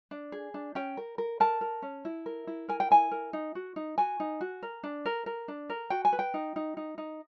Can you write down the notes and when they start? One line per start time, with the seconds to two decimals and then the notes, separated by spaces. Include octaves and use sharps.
0.11 D4
0.32 G#4
0.54 D4
0.75 C#4 G5
0.97 A#4
1.18 A#4
1.40 A#4 A5
1.61 A#4
1.82 C#4
2.05 E4
2.26 A#4
2.47 E4
2.69 A#4 G#5
2.80 G5
2.91 E4 G#5
3.11 A#4
3.33 D#4
3.55 F#4
3.76 D#4
3.98 F#4 G#5
4.20 D#4
4.41 F#4
4.63 A#4
4.83 D4
5.06 A#4
5.26 A#4
5.48 D4
5.70 A#4
5.90 F#4 G5
6.05 G#5
6.13 B4
6.19 G5
6.34 D#4
6.56 D#4
6.77 D#4
6.98 D#4